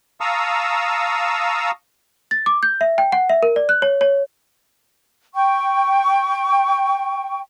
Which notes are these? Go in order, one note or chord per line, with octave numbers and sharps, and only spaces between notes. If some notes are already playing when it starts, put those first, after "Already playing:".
F5 A5 A#5 C#6 D#6 E6
A6
D6
G6
E5
G5
F#5
E5
A#4
D5
F#6
C#5
C#5
G5 C#6